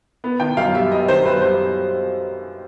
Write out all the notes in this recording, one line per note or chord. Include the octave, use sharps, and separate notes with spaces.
B3
D#3 G5
F#2 F5
G3 E5
B3 D#5
D#3 C5
F#2 B4
G3 C5